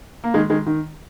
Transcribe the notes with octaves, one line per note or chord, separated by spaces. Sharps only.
A#3
D#3 G#3
D#3 G#3
D#3